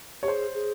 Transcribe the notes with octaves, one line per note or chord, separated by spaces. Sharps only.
G4 C#5
G#4 C5
G#4